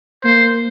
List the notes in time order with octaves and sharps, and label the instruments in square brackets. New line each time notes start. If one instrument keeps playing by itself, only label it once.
[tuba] A#3 [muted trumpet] C5